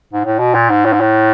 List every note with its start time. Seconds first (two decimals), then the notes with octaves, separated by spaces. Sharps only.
0.13 G#2
0.25 A2
0.39 B2
0.54 A#2
0.70 G#2
0.85 A2
0.93 G#2
1.00 A2